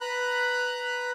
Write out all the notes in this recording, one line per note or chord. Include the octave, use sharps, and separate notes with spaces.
B4 A#5 B5 F#6